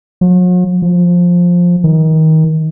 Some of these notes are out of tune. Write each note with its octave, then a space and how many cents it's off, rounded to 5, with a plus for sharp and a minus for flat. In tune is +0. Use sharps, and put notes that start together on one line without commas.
F#3 -45
F3 +10
D#3 +25